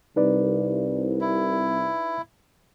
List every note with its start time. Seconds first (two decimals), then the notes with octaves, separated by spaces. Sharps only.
0.16 C2 D#4 B4 D5
1.21 E4